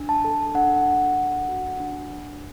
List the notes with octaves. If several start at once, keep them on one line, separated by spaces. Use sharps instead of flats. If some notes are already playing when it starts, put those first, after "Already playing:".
Already playing: D4
A5
A4
D4 F#5
A4
D4
F#4
D4